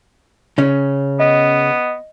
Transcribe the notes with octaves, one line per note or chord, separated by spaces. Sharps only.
C#3 C#4
B3 D#5